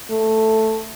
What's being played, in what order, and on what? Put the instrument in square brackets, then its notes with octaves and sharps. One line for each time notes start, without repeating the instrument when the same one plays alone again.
[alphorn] A3